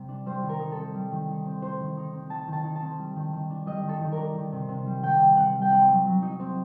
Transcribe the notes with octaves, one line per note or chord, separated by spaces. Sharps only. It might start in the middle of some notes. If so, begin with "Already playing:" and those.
Already playing: C3 G3
D4
G3 C5
D#3
A#4
D#4
A4
C4
G3
D#3
D#4
C4
A3 C5
D#3
D#4
C4
A3 A5
D#3
A5
D#4
A5
C4
G3
D#3
D#3
D4
G3 D#5
D#3
A4
D#3
D4 A#4
D#3
C3
C3
G3
D#3 G5
C3
C3 F#5
G3
G5
C4 F#5
F#3
F#3
D#4
C4